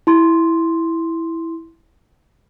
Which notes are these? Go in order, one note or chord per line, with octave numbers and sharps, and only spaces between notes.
E4 C6